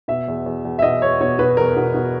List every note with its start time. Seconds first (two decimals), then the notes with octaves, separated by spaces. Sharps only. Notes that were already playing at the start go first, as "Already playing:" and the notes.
0.08 B2 E5
0.28 E2
0.46 E2
0.65 E2
0.79 E5
0.82 B2 D#5
1.02 E2 C#5
1.21 B2 C#5
1.39 B2 B4
1.57 E2 A#4
1.77 B2
1.94 B2